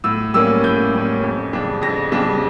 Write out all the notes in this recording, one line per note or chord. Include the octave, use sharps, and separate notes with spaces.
A2 E6
G3 A#3 C#4 E6
A2 G6
G3 A#3 C#4
F2
C#3 G3 D4
F2 A#6
C#3 G3 D4